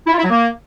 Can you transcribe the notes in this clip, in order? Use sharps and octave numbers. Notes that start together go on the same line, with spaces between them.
E4
F4
E4
F#3
A#3